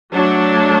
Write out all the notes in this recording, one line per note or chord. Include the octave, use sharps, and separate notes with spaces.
F#3 A3 D4